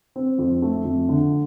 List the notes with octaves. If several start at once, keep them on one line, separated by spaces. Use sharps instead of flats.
C4
F2
A3
F2
D3